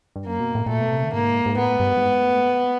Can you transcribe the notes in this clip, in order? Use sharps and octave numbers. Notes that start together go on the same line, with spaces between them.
G2
F#2 A#3
B2
A2
A2
A#2 A3
B2
C3
D3
G#2 A#3
G#2
A2 B3
G2
G2
G#2
A2
B2